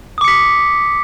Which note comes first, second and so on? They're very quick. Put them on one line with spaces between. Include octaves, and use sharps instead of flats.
D#6 D6 C#7 B6